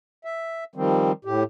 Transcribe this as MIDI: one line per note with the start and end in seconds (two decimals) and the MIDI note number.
0.25 0.64 76
0.75 1.12 51
0.75 1.12 53
0.75 1.12 55
0.75 1.12 60
1.25 1.43 45
1.25 1.43 67